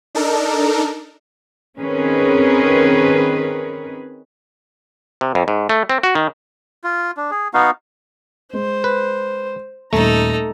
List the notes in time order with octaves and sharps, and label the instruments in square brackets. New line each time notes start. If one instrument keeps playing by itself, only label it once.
[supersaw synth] D4 D#4 A4 A#4
[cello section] D#3 C4 C#4 G#4 A#4 B4
[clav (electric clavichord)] C3
F2
G#2
A3
C4
F#4
D#3
[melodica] F4
D4
G#4
B3 D#4 F#4 F5
[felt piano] G#3 [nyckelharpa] C5
[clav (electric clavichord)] B4
[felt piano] D#1 [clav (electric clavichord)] A3 [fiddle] D#4 A4 [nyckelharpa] A#5